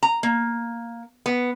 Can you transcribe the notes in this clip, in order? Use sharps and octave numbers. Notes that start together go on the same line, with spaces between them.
A#5
A#3
B3